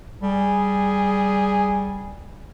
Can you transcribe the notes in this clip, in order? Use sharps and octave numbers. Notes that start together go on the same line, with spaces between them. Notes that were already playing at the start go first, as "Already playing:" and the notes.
G3 G#4